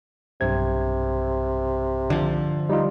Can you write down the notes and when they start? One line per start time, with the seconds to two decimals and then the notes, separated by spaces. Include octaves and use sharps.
0.41 B1 G2 C3 G#6
2.10 D3 F3
2.69 G3 D#4 F4